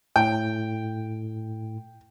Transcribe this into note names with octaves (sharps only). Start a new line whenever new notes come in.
A2 G5